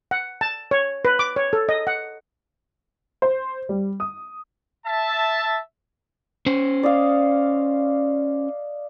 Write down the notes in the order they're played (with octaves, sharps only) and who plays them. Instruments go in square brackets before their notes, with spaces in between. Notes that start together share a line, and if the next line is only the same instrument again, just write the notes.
[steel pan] F#5
A5
C#5
B4
D6
C#5
A4
D#5
F#5
[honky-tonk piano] C5
G3
D#6
[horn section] E5 A5
[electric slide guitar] C#4 C5
[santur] D5 D#5 F5